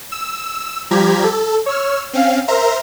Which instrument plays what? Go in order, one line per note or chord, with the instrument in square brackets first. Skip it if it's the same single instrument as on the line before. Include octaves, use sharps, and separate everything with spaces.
[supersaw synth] E6
F3 G3 G4 A#5 G#6 B6
A4
C#5 E6 F6
C4 C#4 F5
A#4 C5 E5 A#5 C6